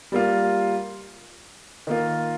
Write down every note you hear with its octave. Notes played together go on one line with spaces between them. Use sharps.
G3 A#3 F4
D#3 A#3 F4